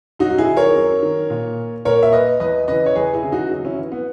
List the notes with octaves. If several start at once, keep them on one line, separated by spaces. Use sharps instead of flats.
F#2 D#4 F#4
F#4
E4 G#4
D#3
A#4 C#5
F#2
D#3
A#2
A#2 A#4 C#5
E5
B4 D#5
E2 B4 D#5
C#3 E3 B4 D#5
C#5
E2 G#4 B4
E4 G#4
C#3 E3
D#4 F#4
F#2
C#4 E4
E3
B3